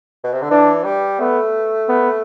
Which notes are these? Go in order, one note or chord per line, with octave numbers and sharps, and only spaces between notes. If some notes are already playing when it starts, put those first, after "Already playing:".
B2
C3
D3
E3 D4
G3
A3 B3
B3